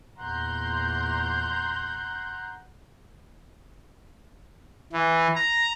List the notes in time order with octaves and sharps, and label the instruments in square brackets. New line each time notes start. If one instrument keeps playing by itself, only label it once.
[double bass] E2 A#2 [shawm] F#5 [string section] A#5 C6 G6
[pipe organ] E3
A#5